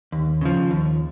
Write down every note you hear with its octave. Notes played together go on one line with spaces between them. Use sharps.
D#2
C#3 F3
D#2